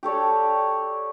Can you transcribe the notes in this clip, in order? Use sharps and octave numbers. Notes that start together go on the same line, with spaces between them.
G4 A4 C#5 D5